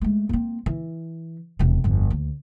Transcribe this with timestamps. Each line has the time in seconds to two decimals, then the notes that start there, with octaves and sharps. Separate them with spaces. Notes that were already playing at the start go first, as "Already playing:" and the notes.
0.01 G#3 A3
0.29 A#3 C4
0.66 E3
1.59 E1 C3
1.84 G1 F2
2.10 D2